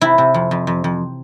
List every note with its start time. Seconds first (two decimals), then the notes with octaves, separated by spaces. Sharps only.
0.01 C3 E4
0.18 C3
0.34 F2
0.51 F2
0.67 F2
0.84 F2